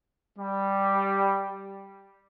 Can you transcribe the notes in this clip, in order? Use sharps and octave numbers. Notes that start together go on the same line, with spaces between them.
G3